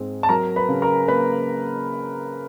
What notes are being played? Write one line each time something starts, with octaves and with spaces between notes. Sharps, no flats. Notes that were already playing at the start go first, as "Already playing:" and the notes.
Already playing: G#2 G#3 C4
A5
F#3 A#4 A#5
B4 B5
C#3
A#4 A#5
A#3 B4 B5